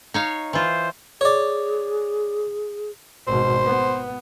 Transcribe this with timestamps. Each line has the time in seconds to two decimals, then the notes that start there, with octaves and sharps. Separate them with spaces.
0.14 D#4 C#5 F5
0.53 E3 F4 C5
1.21 G#4 C#5 D5
3.28 G#1 B2 C5
3.65 B3